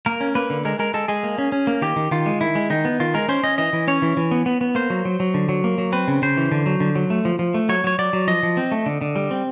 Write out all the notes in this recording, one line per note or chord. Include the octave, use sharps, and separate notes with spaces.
A#3 A#4
C#4
A#3 B4
D3
G#3 A#4
G#3 A#4
G#3 A4
G#3 G#4
A#3
C#4
C#4
A#3
D#3 G4
D#3
D#3 F4
G#3
D#3 E4
G#3
D#3 D#4
B3
D#3 F4
G#3 A#4
C#4 C5
C#4 D#5
E3 D#5
E3
C#4 C#5
E3
E3
B3
B3
B3
A#3 C5
F#3
F#3
F#3
D3
F#3
A#3
F#3
C4 B4
C#3
C#3 C5
E3
D3
F#3
D3
F#3
A3
F3
F3
A3
F#3 C#5
F#3 C#5
F#3 D5
F#3
F3 D#5
F3
C4
A3
D3
D3
G3
C4